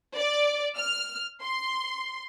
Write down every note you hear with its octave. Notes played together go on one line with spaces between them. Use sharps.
D5
F6
C6